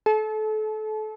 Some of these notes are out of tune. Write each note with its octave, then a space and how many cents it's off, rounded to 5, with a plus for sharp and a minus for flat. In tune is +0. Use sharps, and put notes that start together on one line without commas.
A4 -30